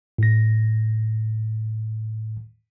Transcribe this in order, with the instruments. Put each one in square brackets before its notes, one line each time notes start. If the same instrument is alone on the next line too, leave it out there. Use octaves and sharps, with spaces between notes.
[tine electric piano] A2 A#6